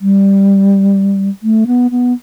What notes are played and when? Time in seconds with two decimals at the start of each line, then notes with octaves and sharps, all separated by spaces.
0.01 G3
1.43 A3
1.67 B3
1.91 B3